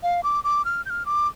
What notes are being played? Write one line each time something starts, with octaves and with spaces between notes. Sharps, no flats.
F5
D6
D6
F6
G6
F6
D6